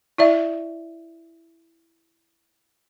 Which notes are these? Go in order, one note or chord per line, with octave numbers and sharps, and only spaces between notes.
E4 D5 E5